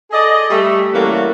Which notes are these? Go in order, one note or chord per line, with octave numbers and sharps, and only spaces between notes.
G#4 A4 D5 D#5
G3 A3
E3 G3 A3 A#3 C#4 F#4